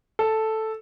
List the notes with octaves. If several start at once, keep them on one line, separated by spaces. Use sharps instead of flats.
A4